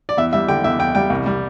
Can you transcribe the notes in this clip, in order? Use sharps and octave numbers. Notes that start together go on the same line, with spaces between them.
D5
E2 E5
G3 E5
D3 G5
E2 E5
E2 G5
G3 G5
C2
G3